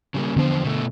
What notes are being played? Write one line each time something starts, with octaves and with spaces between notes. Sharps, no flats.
C#3 G3 A#3
E2 D3 F3 B3 D4 C5
B2 A3